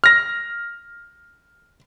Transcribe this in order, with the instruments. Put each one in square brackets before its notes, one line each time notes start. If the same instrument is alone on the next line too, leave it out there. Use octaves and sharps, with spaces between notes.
[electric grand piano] F6 A#6